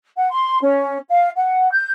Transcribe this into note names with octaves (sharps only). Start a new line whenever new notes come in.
F#5
C6
C#4
F5
F#5
G6